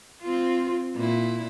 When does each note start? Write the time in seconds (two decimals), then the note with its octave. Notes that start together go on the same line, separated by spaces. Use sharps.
0.22 C4 F4
0.95 A#2 E4